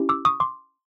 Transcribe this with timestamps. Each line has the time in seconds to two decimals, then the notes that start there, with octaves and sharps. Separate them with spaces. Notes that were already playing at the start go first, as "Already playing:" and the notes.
Already playing: C#4 E4 G4
0.09 D6 E6
0.25 C#6 D#6
0.40 C6 D6